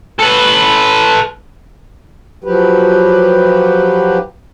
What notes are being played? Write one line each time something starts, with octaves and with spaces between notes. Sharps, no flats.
A4 B4
F3 F#3 G4 B4